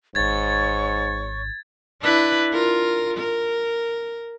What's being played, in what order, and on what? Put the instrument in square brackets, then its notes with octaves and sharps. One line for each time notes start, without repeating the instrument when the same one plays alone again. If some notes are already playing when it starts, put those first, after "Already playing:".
[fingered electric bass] D#1 G#1 [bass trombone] G#2 [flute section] C#5 C#6 [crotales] G#6 A6
[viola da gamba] D4 E4 B4
F4 A#4
A#4